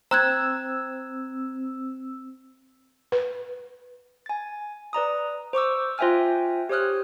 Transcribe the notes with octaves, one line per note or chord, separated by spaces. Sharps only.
C4 A#5 E6 F#6 G#6
B4
G#5 A6
B4 D5 A#5 D#6
C5 C#6 D6 E6
F4 C5 E5 G5 G#5 F6
G4 C5 C#5 D#6 F6 F#6